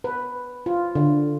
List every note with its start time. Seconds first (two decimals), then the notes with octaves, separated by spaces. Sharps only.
0.04 B4
0.66 F4
0.95 D3